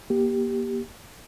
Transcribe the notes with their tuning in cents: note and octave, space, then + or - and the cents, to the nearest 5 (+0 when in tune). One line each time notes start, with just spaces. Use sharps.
A#3 +30 G4 +0